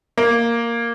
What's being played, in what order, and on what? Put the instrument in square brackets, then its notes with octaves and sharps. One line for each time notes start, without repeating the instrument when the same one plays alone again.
[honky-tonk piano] A#3